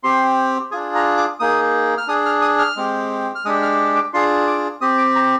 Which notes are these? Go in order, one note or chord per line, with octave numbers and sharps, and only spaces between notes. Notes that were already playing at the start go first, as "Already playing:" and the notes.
C4 G4 C6
D4 F4 G#4 G#5
A#5
D6
A#3 D#4 G#4 D#6
F6
D4 G#4 D#6
F6
D#6
F6
G#3 C4 G4
F6
G#3 D4 G4 D#6
F6
D6
D4 F4 G#4 C6
D6
C4 G4 D#6
D6
A#5